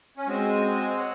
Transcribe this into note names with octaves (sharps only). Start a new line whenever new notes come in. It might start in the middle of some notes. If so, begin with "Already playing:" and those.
C#4
G#3 C4 F#4 C5 D#5 G#5
C#5 F#5